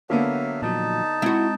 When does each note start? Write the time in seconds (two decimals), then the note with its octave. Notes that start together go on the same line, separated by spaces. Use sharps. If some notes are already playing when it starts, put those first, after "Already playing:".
0.10 D3 F#3 A#3 B3 E5 F5
0.62 A#2 F3 F#3 D#4 A5
1.22 G#3 C4 E4 F#4